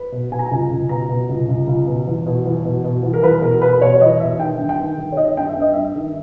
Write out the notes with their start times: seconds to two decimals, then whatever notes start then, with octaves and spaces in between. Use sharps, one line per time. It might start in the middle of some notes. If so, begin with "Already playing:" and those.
Already playing: B4
0.12 B2
0.31 B2 G#5
0.39 A#5
0.46 G#5
0.51 C#2
0.71 C#2
0.89 B2 A#5
1.09 B2
1.29 C#2
1.49 C#2
1.67 C#2
1.87 B2
2.06 E2
2.26 B2
2.46 E2
2.65 B2
2.84 B2
3.03 E2
3.13 A#4
3.23 E2 B4
3.42 B2 A#4
3.61 B2 B4
3.73 B4
3.81 B2 C#5
4.01 E2 D#5
4.20 B2 E5
4.39 D#3 G5
4.59 G2
4.69 G5
4.79 D#3
4.97 D#3
5.12 C#5
5.17 D#3 D#5
5.37 G2 G5
5.49 E5
5.56 G2
5.62 D#5
5.74 G2 E5
5.95 D#3